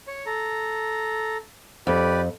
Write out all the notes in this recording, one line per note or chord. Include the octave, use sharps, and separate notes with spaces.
C#5
A4 A#5
F2 G4 B4 D5